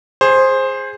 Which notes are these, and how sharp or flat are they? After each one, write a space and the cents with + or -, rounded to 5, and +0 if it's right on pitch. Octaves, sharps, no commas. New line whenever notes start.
G#4 -5 C5 +10